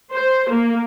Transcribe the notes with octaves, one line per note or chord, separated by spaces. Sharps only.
C5
A#3